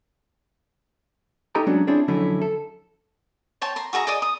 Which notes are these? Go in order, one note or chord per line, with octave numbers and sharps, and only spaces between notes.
D#4 G4 A4 D#5 G5 A#5
F#3 G#3 A3 C#4 D4 F#4
C4 D4 E4 F4 G#4 C#5
F2 D3 F#3 A3 C#4 E4
A4
C5 C#5 G5 A5
A#5 C6
F#4 G#4 E5 A#5
G#4 D5 D#5 D#6
D#6